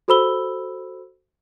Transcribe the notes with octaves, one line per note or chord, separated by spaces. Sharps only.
F#4 A4 C5 B5 E6 G7